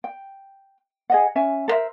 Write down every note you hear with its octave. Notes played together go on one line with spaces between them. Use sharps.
G5
G#4 D#5 F#5
C#4 E5 G#5
A4 A#4 C5 E5